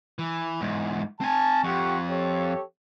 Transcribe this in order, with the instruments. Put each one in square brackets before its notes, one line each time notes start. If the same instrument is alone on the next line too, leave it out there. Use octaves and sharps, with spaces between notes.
[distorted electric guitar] E3
E2 G#2
[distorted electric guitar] C4 G#5 [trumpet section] A5
[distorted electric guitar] F2 [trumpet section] G4 F#5 C#6
[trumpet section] G4 A4 C#5